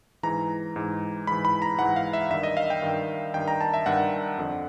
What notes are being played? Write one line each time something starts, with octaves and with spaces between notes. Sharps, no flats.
G#2 E3 A#5
G#2 E3
G#2 E3 B5
B5
A#5
G#2 E3 F#5
F5
E5
G2 D#3 E5
D#5
F5
G5
G2 D#3
G2 D#3 G5
A#5
A5
E5
G2 D#3 F#5
F2 D3